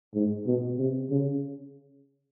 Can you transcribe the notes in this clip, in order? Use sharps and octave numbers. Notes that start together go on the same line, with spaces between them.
G#2
B2
C3
C#3